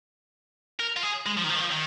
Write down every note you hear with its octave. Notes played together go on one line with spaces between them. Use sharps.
A#4
F4
G#4
G#3
F3
D#3
F3
D#3
F3
D#3